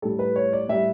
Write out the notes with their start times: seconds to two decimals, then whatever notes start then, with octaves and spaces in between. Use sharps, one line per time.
0.02 A2 G3 A4
0.19 B4
0.36 C#5
0.53 D5
0.69 A2 G3 E5